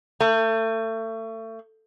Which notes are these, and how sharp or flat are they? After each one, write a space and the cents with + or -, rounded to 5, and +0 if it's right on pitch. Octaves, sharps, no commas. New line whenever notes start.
A3 +30